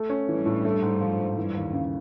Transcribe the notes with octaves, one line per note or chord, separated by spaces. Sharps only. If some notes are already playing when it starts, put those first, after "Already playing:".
Already playing: A3
C#4
G2 E3
A2
A3
G#2
F3
G#2
G2 E3
D#2
C#3